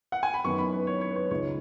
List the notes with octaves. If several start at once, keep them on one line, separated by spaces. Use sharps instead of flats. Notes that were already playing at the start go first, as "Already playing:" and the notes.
F#5
G#5
B5
F#2 D#3 B3 C#6
B5
B4
C#5
C#5
B4
C#5
C#2 C#3 G#3 D#4 C#5